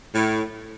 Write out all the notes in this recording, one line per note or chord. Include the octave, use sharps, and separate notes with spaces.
A2